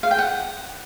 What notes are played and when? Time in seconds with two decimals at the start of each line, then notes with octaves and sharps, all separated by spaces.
0.03 F5
0.11 G5
0.19 F#5